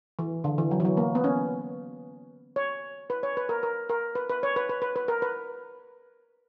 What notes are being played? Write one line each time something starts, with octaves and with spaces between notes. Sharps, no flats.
E3
D3
E3
F#3
E3
F#3
A#3
B3
C#4
C#5
B4
C#5
B4
A#4
A#4
A#4
B4
B4
C#5
B4
B4
B4
B4
A#4
B4